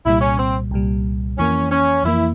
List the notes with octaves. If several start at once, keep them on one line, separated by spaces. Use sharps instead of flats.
C2 A#2 G3 E4
C#4
C4
C2 A#2 G3
F2 E3 A#3 C#4
C#4
F2 E3 A#3 E4